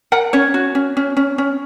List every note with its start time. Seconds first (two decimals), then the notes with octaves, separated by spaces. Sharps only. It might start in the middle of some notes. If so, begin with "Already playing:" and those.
0.12 A#4 F#5
0.33 C#4 C#5
0.54 F#4
0.75 C#4
0.97 C#4
1.17 C#4
1.38 C#4